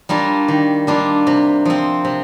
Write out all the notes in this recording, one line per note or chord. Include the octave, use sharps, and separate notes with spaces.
G3 A#3 D4 F4
D#3
G3 A#3 D4 F4
C3
F3 C4
C3